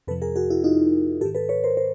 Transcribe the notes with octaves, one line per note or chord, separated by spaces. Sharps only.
F2 C3 F3 A4 B4
G#4 A#4
F#4 G#4
E4 F#4
D#4 F4
G#2 D#3 G4 A4
A4 B4
B4 C#5
A#4 C5
A#4 C5